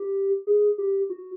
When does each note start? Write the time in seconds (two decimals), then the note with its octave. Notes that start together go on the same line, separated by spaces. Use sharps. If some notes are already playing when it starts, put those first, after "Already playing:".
Already playing: G4
0.47 G#4
0.78 G4
1.10 F#4